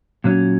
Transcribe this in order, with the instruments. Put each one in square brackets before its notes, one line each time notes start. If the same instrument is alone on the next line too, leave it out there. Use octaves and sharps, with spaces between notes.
[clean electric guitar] A#2 F#3 C#4